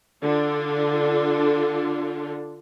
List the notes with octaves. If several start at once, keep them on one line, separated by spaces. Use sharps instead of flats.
D3 D4 F4 A4